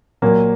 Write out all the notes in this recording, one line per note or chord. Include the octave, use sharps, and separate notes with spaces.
A#2 F#3 A#3